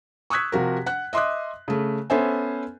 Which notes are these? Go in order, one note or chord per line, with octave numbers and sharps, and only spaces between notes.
C#6 D#6 E6 F#6 G#6 B6
C3 F3 F#4 A#4
F#5 F#6
D#5 E5 C6 D6 D#6 F#6
C#3 A3
B3 C#4 A4 C5 E5 G#5